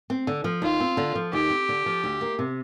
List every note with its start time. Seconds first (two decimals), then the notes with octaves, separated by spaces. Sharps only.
0.10 C4
0.27 D3
0.44 F3
0.62 D#2 F4
0.80 C4
0.97 D3
1.15 F3
1.33 D#2 G4
1.50 C4
1.69 D3
1.86 F3
2.04 D2
2.21 A#3
2.39 C3